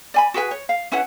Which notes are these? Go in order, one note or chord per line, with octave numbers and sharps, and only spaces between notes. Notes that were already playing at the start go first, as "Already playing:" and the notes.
D5 G#5 B5
F#4 G#4 B4 G#5
C#5
F5
C#4 E4 B4 F#5